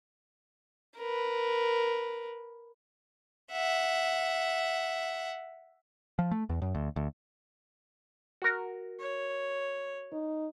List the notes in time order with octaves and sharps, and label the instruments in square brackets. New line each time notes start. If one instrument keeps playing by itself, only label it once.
[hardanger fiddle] A#4 B4
[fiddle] E5 F#5
[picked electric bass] F3
A3
E2
F#2
D2
D2
[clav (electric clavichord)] F#4 A#4
[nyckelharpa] C#5
[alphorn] D#4